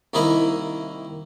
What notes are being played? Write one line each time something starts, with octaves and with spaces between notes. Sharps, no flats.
C2 D#3 A#3 E4 D#5 B5